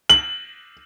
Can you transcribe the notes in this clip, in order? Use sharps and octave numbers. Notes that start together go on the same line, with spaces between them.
F#7